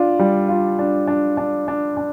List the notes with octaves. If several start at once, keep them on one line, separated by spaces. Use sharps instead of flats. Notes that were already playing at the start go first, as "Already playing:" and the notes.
Already playing: D4 F4
G3
F4
D4
D4
D4
D4
D4